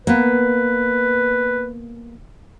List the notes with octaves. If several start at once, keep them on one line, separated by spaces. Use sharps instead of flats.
A#3 B3 B4